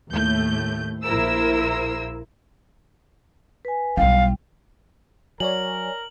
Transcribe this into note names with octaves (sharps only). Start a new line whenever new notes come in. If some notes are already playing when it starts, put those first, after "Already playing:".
D#2 A2 A3 G6
A#1 A#3 E4 A#4 C5 E6
B4 G#5
B1 G3 E4 F5
F#3 A#4 C#5 D5 G#5 F#7